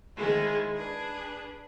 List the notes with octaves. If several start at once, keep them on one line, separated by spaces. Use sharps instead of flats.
D#3 G#3 E4 C5
D4 G#4 B4